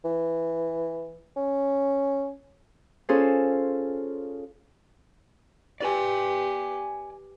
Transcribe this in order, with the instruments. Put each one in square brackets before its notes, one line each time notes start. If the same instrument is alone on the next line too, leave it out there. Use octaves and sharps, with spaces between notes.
[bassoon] E3
C#4
[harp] C#4 F4 G#4 A4 C5
[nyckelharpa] G4 B4 [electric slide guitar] D5 G#5